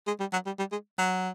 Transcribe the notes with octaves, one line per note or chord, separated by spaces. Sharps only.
G#3
G3
F#3
G3
G3
G#3
F#3